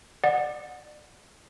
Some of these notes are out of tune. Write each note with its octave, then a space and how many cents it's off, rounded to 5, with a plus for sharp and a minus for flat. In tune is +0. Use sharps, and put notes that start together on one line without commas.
D5 +30 F#5 -15 D#6 +0